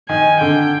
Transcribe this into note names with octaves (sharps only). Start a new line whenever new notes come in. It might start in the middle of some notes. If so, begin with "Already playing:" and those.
D#3 G#5
D3 G5